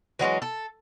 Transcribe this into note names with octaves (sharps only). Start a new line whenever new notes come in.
E3 F#3 G#3 C#4
A4